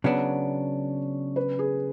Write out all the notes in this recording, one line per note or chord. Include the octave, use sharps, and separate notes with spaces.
C#3 F#3 B3 D4 C#5
B4
G#4